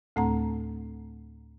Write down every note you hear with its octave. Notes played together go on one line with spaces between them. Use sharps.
D2 A2 A3 C4 F#5 A#5